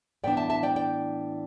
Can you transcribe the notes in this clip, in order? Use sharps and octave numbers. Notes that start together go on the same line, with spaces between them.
A2 E3 B3 D4 D5 G5
E5 A5
E5 A5
D5 G5
D5 G5